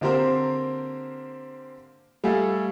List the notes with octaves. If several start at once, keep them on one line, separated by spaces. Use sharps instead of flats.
D3 A#3 C4 G4 A#4 C5
G3 A3 G#4 A4 F5